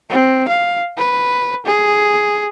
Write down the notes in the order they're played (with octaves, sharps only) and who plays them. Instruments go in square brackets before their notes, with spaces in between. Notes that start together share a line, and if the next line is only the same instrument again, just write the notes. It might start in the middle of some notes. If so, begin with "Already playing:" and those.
[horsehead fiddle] C4
F5
B4
G#4